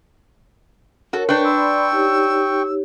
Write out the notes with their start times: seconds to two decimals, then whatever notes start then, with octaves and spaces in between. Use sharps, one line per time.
1.13 F#4 A4 A#4 C#5
1.29 D4 B4 G5 C#6 G6
1.45 D5 B5 C6 E6
1.92 D#4 G4 C#5